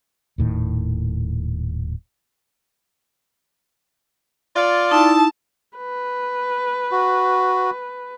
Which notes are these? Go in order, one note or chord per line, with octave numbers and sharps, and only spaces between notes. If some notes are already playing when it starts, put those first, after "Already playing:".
D#1 A2 D#3
F4 D5
D#4 E4 A5
B4
F#4